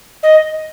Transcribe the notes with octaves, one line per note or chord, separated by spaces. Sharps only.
D#5